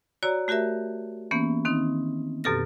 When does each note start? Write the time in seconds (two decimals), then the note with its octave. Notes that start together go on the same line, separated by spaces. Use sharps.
0.23 F#4 C#5 D5 A#5 E6
0.48 A3 F#4 G4 A#4 E5
1.31 E3 A#3 B3 C#4
1.65 D#3 C4 D#4
2.44 F#2 B2 G4 A4 F6 A#6